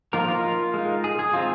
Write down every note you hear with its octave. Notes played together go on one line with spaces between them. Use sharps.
F3 A#3 D#4 F4 A#4
F4 A#4
G#3 D#4
G#4
G#4
G#3 C4 D#4 F4